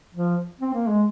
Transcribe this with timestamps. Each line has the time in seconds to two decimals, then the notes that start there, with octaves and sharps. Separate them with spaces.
0.15 F3
0.60 C4
0.73 A#3
0.87 G#3